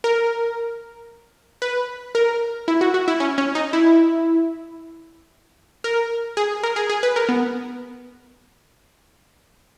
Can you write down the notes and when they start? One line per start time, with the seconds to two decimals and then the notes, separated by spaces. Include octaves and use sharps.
0.04 A#4
1.62 B4
2.15 A#4
2.68 E4
2.81 F#4
2.94 F#4
3.08 E4
3.20 C#4
3.38 C#4
3.55 D#4
3.73 E4
5.84 A#4
6.37 G#4
6.63 A#4
6.76 G#4
6.89 G#4
7.03 B4
7.16 A#4
7.29 B3